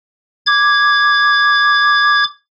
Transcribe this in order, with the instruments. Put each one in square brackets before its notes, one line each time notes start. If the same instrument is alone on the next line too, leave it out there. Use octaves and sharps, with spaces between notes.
[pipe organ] D6 G#6